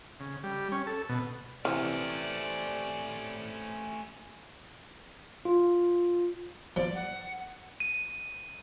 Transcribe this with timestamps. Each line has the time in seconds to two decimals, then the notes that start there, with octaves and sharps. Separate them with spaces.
0.20 C#3
0.44 G3
0.72 C#4
0.87 A4
1.09 B2
1.65 C3 E3 A3 C#4 D5 F6
5.45 F4
6.76 F3 D5
6.95 F#5
7.80 D#7